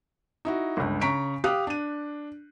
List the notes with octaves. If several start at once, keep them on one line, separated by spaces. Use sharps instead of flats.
D#4 E4 F#4
G1 C#2
C#3 A#5 C#6 B6 D7
G4 F5 D6 D#6 F#6
D4 D#7